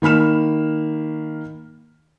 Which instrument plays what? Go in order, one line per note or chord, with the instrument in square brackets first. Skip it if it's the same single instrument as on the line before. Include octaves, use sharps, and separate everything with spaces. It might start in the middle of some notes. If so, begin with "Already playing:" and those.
[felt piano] D#3 A#3 B5 F6 E7